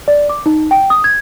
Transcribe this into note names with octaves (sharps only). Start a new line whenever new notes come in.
D5
D6
D#4
G5
D#6
G#6